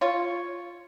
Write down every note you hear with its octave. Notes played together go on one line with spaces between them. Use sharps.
F4 C#5